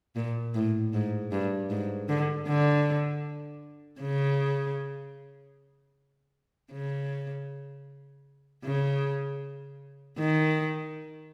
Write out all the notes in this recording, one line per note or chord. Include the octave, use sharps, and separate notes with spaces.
A#2
A2
G#2
G2
G#2
D3
D3
C#3
C#3
C#3
D#3